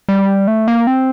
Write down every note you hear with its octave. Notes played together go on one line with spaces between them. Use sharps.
G3
A3
A#3
C4